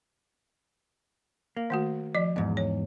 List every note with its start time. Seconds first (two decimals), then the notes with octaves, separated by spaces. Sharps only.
1.57 A#3
1.70 D#3 A3 F#4
2.15 F3 D5 D#5
2.36 E2 G#2
2.57 C#5